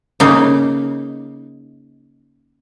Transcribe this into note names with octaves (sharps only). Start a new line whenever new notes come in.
C#3 A#3 D#4